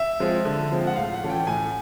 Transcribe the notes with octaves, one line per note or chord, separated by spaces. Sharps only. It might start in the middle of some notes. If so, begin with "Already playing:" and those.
Already playing: E5
F3 G#3 C4 F4
D3
F3 G#3 C4 F4
F#5
A2 F5
F#5
E3 A3 C#4 F4
G5
A2 G#5